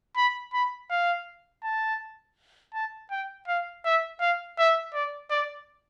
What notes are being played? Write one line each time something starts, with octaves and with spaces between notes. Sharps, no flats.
B5
B5
F5
A5
A5
G5
F5
E5
F5
E5
D5
D5